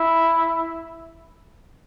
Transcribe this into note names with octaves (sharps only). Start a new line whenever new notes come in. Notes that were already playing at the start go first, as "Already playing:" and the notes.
Already playing: E4